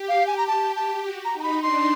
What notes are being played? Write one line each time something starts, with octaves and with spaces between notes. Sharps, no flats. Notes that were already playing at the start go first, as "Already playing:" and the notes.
Already playing: G4
F5
G#5
A#5
G4 A5
A5
F#4
A#5
D#4
A#5
B5
D4 C6